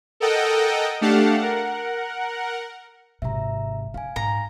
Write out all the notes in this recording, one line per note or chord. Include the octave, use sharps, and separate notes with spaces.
A4 A#4 D#5 F#5 G5
A3 D4 G4 F5 F#5 A5
A#4 F#5
G#1 C3 E5 A#5
C#3 F5 G#5
G#2 A#5